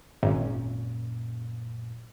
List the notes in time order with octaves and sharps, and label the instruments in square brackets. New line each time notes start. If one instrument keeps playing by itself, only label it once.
[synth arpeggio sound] G#1 [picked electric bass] F#2 A#2 C#4